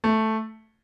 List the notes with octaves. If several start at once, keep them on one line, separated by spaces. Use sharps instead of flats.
A3